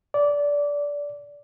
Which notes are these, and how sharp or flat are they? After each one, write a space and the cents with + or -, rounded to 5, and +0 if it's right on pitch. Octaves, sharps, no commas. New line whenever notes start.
D5 -20